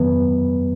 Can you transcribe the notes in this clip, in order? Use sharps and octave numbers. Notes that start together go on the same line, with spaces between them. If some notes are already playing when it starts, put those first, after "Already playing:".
Already playing: F2 D#3 F#3 B3 B4